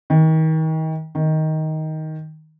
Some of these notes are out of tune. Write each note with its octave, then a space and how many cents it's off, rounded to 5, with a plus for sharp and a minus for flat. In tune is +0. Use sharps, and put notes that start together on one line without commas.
D#3 +35
D#3 +10